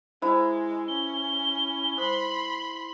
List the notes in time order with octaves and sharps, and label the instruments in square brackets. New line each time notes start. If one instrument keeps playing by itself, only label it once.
[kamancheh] G#3 [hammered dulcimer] E4 [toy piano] C5 A#5 B5
[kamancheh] C#4 [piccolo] G7
[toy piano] C5 D#6 [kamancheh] B5 C6